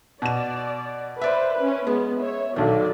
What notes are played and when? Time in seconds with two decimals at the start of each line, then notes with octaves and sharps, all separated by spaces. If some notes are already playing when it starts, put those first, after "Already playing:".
0.22 B2 D5 E7
1.22 B4 C5 D5 E5
1.56 C#4 B4
1.87 G#3 B3
2.18 C#5 E5
2.56 B1 D3 D#3 F#3 D5